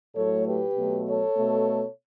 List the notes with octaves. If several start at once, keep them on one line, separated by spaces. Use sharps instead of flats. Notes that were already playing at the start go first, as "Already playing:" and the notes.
A2 F#3 A3 A4 C#5
G4 B4
B2 F#3 A3
A4 C#5
B2 A3